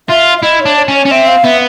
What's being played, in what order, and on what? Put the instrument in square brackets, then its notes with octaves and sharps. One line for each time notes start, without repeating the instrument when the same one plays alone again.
[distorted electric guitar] F4 [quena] E5
[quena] E5
[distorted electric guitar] E4 [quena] D#5
[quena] C#5
[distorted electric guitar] D4
[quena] C#5
[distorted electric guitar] C#4
[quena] C#5
[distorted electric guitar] C#4
[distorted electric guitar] C4 [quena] E5
[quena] F5
[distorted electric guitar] B3 [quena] E5